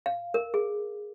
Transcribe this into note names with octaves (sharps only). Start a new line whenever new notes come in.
F5
A#4
G#4